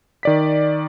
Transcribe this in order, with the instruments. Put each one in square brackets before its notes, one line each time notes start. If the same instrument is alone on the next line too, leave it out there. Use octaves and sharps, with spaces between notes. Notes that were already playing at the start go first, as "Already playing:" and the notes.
[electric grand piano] D#3 D5 B6